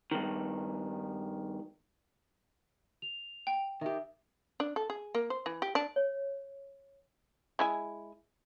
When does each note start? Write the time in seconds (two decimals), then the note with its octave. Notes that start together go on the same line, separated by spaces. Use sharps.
0.11 G2 D#3
3.02 F7
3.47 G5
3.81 D#3 G4 E5
4.60 D4
4.76 A4
4.90 G#4
5.15 A#3
5.30 C5
5.46 E3
5.62 G4
5.75 D4
5.96 C#5
7.59 G#3 E4 G#5